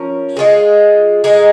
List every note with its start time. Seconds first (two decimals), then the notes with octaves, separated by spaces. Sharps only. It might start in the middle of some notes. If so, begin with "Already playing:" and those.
Already playing: F3 C#4 A#4
0.37 G#3 F4 G#4
1.24 G#3 D#4 G#4